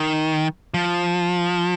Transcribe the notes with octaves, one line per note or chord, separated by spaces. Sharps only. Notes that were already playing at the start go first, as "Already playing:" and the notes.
Already playing: D#3
F3